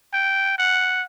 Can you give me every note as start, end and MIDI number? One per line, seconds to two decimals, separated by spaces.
0.13 0.56 79
0.58 1.03 78